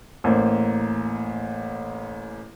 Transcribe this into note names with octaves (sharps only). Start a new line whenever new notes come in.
A1 A#3 C5